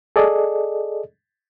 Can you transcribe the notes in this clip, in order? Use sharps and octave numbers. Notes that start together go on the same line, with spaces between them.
G#4 A4 D5 D#5